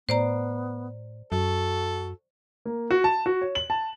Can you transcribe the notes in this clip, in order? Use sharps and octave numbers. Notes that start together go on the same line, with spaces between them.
A2 B3 C5 D5 A#5
F#2 F#4 A4
A#3
F#4
A5
F#4
C#5
F#7
A5